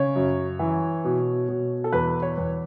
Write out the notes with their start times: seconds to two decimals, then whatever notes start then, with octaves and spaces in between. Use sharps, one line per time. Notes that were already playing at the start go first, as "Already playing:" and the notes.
Already playing: C#3 C#5
0.16 F#2
0.59 E3
1.04 B2
1.49 B2
1.84 A4
1.93 E2 B4
2.22 C#5
2.37 E2